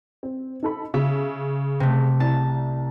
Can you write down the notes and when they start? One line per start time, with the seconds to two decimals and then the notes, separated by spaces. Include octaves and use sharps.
0.23 C4
0.63 D#4 A4 B5
0.94 C#3 E5
1.80 C3 A3
2.20 C2 A5